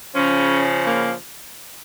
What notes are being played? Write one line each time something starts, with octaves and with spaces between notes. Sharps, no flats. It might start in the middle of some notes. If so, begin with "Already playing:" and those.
C#3 F3 C#4
A#3